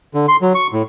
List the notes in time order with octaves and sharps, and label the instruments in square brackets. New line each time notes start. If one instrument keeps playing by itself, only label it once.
[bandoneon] D3
C6
F#3
C#6
A2